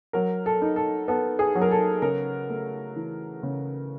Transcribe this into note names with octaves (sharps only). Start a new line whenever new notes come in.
F#3 A#4
A4
D#4
A4
B3 A4
G#4
F#3
A#4
A4
C#3 A#4
A3
E3
C#3